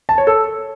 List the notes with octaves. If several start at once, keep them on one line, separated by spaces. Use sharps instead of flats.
A5
C#5
A4